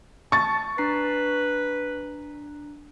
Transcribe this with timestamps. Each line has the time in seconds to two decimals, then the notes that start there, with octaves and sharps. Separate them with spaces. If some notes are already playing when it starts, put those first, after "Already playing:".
0.32 A5 C#6 A6
0.78 D4 B4 A#5 C7